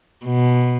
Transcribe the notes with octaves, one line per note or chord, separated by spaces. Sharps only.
B2